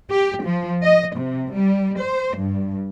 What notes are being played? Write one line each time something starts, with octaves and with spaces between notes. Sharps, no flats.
G4
F3
D#5
C3
G3
C5
G2